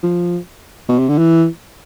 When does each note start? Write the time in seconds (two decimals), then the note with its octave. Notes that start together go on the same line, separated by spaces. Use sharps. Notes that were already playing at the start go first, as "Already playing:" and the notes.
0.03 F3
0.88 B2
0.98 C3
1.08 D3
1.18 E3